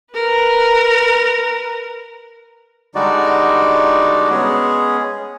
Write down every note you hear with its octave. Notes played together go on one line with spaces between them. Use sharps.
A#4 B4
D3 G3 G#3 D#4 F#4 D5
G#3 B3 C#4 G#4